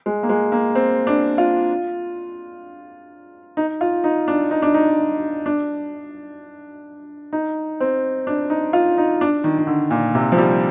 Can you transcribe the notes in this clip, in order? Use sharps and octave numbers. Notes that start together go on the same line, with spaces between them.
G#3
A#3
G#3
A#3
C4
D4
F4
D#4
F4
D#4
D4
D#4
D4
D#4
D4
D#4
C4
D4
D#4
F4
D#4
D4
D#3
D#3
D3
A#2
C3
F3
G3